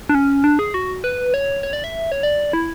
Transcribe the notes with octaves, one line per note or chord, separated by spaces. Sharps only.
D4
C#4
D4
G#4
F#4
B4
C#5
C#5
D5
E5
C#5
D5
E4